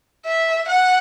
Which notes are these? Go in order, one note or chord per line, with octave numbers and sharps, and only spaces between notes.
E5
F#5